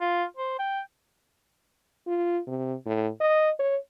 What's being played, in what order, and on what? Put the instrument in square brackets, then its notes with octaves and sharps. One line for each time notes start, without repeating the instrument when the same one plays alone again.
[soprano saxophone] F4
C5
G5
[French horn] F4
C3
A2
D#5
C#5